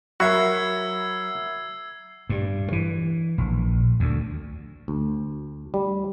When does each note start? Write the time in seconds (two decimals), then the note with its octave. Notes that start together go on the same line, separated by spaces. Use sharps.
0.20 F#3 F#4 A#4 E5 B5 E6 G#6 C7
2.30 G2
2.72 E3
3.38 A#1
4.00 D2
4.88 D2
5.74 G3